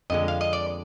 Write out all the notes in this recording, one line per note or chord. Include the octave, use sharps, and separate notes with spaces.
F2 D3 G#3 D#5
F5
D#5
D5